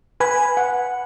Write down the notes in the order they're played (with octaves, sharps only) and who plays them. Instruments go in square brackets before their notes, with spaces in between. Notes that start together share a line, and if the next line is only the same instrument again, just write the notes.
[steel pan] B4 [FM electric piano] G#5 B5
[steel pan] F#5